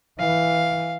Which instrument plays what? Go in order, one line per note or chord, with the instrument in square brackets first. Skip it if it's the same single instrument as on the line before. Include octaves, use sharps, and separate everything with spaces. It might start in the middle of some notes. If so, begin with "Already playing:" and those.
[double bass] E3 [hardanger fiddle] F5